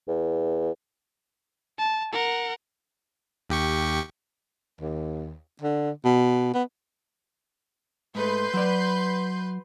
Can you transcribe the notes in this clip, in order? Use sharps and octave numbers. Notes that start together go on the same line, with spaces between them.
E2
A5
A#4 F#5
D#2 G4 C#6
D#2
D3
B2
B3
G#2 A3 B4 C6 G6
F#3 D5